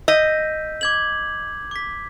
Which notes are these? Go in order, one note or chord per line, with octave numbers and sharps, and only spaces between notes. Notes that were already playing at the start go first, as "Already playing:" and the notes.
D#5 E6 G6 B6
D6 G#6 F#7
D6 B6